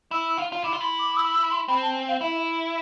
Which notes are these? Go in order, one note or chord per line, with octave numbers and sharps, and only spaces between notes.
E4 E6
F4
F4
E4 D6
F4
E4 C6
D6
D6
E6
E6
C6
C4 B5
A5
G#5
F5
E4 E5